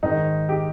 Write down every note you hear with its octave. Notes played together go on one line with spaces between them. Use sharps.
G#2 D#3 D#4
G4